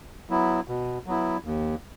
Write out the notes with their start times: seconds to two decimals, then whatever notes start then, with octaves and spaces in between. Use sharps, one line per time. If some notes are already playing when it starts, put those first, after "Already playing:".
0.30 F#3 B3 E4
0.68 B2
1.06 F#3 B3 E4
1.44 D#2